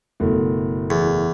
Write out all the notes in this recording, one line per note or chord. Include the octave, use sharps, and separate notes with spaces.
F#1 B2 A3
E2